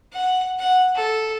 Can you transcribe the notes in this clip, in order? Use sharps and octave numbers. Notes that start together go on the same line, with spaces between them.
F#5
F#5
A4